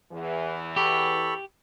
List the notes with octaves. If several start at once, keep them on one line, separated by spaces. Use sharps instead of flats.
E2 E3
G4 A4 B5 C#6